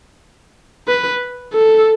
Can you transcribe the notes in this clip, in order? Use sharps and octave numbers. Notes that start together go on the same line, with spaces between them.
B4
A4